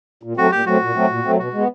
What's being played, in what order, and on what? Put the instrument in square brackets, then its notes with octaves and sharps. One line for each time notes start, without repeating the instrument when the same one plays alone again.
[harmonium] A#2
[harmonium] F#3 A3 C4 [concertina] F#4
[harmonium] A#2 [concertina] G4
[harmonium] F#3 A3 C4 [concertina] F#4
[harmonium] A#2
F#3 A3 C4
A#2
F#3 A3 C4
[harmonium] B2 [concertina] F#4
[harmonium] G#3 B3